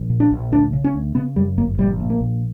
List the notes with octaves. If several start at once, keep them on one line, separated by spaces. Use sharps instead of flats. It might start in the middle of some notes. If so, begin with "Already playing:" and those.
Already playing: A#1
A#2
D4
A#1
D2 D4
C#3
C#4
D2
C#3 B3
F#2 G3
G1 A#3
A#1 G3
A#2
A#3
A#1